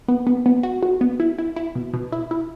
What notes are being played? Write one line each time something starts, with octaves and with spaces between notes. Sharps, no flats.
B3
B3
B3
F#4
F#4
B3
E4
E4
E4
B2
B2
E4
E4